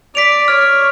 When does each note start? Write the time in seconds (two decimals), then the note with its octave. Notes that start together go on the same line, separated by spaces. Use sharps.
0.15 D5 B6 D7 F7
0.48 C#5 F6